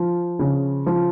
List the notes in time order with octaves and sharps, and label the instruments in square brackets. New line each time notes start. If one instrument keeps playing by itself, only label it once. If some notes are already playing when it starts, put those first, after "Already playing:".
Already playing: [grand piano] F3
C#3
F3